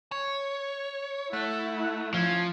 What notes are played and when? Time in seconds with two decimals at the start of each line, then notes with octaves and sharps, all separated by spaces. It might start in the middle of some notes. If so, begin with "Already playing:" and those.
0.12 C#5
1.33 A3 E4 F#5
2.14 F3 C#4